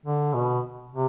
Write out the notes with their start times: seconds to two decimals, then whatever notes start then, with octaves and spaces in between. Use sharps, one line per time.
0.06 D3
0.34 B2
0.92 C3